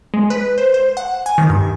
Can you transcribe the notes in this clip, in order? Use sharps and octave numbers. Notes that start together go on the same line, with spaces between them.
G#3
B4
C5
C5
F#5
G#5
D#3
G2